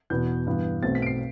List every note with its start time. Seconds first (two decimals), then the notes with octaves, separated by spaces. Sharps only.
0.10 E2 B2 B3 G6
0.47 G2 E3 B3
0.83 B1 B2 A3 C4 A6
0.95 B6
1.02 D7
1.06 C7